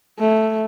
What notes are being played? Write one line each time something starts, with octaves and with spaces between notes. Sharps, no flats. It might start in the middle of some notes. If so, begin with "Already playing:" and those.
A3